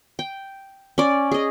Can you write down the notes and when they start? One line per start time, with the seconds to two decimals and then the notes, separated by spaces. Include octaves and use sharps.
0.19 G5
0.98 C#4 D5
1.31 G#4 D#5